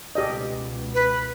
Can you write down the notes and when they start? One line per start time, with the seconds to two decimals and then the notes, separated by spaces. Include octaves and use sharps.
0.15 C#2 B2 G4 D5 D#5
0.94 B4